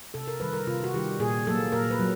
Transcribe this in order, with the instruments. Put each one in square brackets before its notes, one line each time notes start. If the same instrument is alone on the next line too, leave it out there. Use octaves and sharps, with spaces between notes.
[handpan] C3 A4
A#4
D#3 G3 B4
A#4
C3 F4
F#4
D#3 G3 G4
A#2 G#4
F#3 A#3 A4
A#2 A#4
B4
F#3